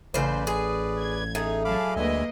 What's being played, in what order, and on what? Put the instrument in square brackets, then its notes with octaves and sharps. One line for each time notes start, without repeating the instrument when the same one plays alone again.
[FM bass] A1 [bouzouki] C#3 C5 [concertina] B4 D5
[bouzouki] G#4
[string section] G#6
[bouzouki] A2 [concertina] D#4 G#4
[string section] F#3 G#4 A5 [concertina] F5 B5 D6
[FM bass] D2 [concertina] G#3 E5 G#5 [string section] A#3 B4 D#5